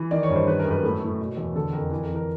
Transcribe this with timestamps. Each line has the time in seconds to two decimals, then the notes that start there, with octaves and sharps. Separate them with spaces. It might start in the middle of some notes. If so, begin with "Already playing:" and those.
Already playing: E3
0.11 D#3 D5
0.23 C#5
0.30 G2
0.36 C5
0.48 D#3 B4
0.59 A#4
0.65 F#2
0.71 B4
0.83 A2 A4
1.02 A2
1.19 B2
1.37 E2
1.55 D3 A4
1.73 F2 A#4
1.91 E3 A#4
2.04 A#4
2.10 E3
2.15 A#4